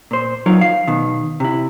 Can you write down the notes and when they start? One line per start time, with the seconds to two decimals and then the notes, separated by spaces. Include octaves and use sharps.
0.11 A#2 C5
0.46 F#3 D#4 F4 A#4
0.61 F5
0.88 B2 D#3
1.40 C3 E4